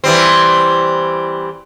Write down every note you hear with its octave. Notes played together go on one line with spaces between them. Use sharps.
E3 G3 C4